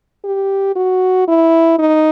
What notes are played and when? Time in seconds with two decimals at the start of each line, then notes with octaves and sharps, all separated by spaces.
0.25 G4
0.76 F#4
1.28 E4
1.79 D#4